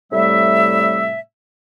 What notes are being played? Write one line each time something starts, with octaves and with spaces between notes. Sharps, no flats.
A2 C3 G3 A3 E5